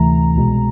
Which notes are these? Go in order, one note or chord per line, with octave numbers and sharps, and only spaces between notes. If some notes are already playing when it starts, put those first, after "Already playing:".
Already playing: D2 C3 E3 A3 A#5
C2 B2 G#3